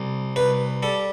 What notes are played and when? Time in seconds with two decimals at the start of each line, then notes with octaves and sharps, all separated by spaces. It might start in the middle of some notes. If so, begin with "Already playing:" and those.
Already playing: C2
0.36 C2 B4
0.83 G3 A4